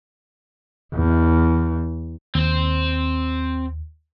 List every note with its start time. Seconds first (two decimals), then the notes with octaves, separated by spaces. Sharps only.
0.94 E2
2.35 D#2 C4 C5